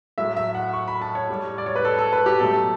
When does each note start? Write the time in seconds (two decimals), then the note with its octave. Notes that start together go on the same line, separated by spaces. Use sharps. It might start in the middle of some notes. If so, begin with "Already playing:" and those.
0.18 A2 F#3 A3 E5
0.36 E5
0.55 F#5
0.73 C#6
0.88 B5
1.02 A5
1.15 C#5
1.29 A2 G3
1.58 D5
1.66 C#5
1.76 B4
1.85 A4
1.98 A4
2.12 B4
2.26 G4
2.40 B2 F#3 A3 A4